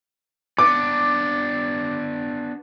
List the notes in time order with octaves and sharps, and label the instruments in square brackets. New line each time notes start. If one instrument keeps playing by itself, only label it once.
[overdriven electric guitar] B3 D4 [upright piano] D6